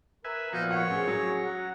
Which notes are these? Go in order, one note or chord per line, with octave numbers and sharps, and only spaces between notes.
A#4 B4 E5 G#5
A#2 F3 B3 D#4 F#4 F5
C#5 F#5
A2 C4 C#4 G#4
F#3 A#5
F#5